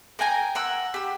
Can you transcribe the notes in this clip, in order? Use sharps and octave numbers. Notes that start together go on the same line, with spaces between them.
A#4 G5 G#5 A#5
A#4 F#5 E6
G4 E6